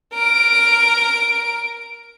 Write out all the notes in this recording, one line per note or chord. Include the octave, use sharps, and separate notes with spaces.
A#4 D7